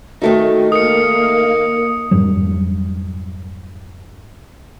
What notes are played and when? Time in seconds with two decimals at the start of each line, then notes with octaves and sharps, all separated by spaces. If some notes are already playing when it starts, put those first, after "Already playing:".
0.22 D#3 A3 D#4 F#4
0.72 A#3 A#4 F5 D#6 C#7
2.11 F2 G#2 F#3 G3